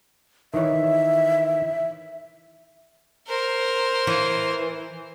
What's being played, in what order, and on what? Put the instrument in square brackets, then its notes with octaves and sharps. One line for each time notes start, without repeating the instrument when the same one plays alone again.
[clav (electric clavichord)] D#3 E3 C#5 [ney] E5
[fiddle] A#4 C5
[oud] E3